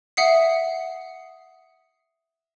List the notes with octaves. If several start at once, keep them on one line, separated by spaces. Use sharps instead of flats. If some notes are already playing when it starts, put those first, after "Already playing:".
E5 F#5 D#6 C7